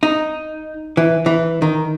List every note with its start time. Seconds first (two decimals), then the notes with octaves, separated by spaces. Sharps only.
0.03 D#4
0.97 E3
1.26 E3
1.62 D#3